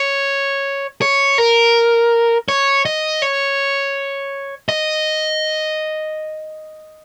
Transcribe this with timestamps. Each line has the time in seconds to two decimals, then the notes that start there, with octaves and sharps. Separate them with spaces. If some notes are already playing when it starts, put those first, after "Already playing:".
Already playing: C#5
1.02 C#5
1.38 A#4
2.49 C#5
2.85 D#5
3.22 C#5
4.69 D#5